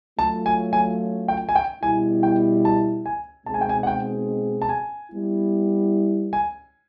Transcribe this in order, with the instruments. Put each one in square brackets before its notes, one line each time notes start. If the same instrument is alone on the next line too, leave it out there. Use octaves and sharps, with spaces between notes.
[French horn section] F#3 A3 C#4 F4 [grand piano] A5
[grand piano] G#5
G#5
G5
G#5
G5
[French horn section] B2 G3 B3 E4 [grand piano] G#5
[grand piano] G5
A5
G#5
[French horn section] B2 G#3 C4 D#4 G#4 [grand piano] A5
[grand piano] G#5
G5
G#5
F#5
G5
A5
G#5
[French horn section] G3 B3 E4
[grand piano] G#5